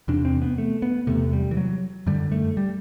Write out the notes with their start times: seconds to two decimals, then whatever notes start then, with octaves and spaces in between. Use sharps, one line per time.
0.08 E2 C3 D4
0.25 C4
0.42 B3
0.58 A3
0.82 B3
1.07 E2 C3 A3
1.33 G3
1.51 E3
1.57 F#3
2.07 F#2 D3 G3
2.32 A3
2.57 G3